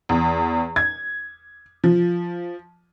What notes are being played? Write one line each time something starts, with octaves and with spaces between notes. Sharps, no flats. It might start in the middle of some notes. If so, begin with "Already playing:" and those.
E2
G#6
F3